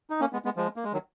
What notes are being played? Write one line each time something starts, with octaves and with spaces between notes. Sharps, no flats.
D#4
A#3 C#4
G#3 B3
G#3 B3
F3 G#3
A#3
G#3
D#3 F#3